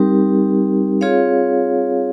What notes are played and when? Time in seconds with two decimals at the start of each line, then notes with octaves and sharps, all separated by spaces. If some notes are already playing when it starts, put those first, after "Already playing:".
Already playing: G3 C4 D#4 G4 A#4
1.01 C4 F4 G#4 C#5 F5